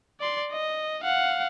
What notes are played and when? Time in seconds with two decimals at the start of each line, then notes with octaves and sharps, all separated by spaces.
0.21 D5 C6
0.52 D#5
1.04 F5 F#5